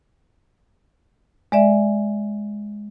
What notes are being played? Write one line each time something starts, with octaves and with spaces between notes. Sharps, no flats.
G#3 D5 E5